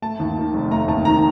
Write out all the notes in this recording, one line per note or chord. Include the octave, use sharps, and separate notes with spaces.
A3 A5
D#2
D#3
F1
A3 A#5
D#2 A5
D#3 A#5